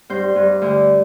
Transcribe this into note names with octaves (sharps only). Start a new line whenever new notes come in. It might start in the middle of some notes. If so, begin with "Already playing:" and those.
G2 C5
G2
D2